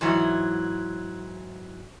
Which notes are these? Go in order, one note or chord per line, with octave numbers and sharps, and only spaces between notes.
G#2 E3 F#3